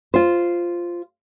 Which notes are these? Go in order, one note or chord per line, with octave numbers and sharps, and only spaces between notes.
F4 C5